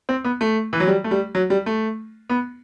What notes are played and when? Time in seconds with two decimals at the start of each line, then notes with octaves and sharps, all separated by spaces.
0.09 C4
0.24 B3
0.41 A3
0.73 E3
0.80 F#3
0.87 G3
1.04 A3
1.11 G3
1.35 F#3
1.50 G3
1.66 A3
2.29 B3